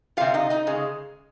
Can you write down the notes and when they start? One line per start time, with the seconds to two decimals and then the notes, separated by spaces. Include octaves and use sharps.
0.17 C3 G3 F4 F5
0.34 D#4 D#5
0.50 D#4 D#5
0.67 C#3 G#3